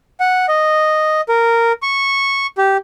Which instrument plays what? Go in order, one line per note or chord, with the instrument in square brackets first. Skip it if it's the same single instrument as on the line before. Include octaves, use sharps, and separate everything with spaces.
[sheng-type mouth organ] F#5
D#5
A#4
C#6
G4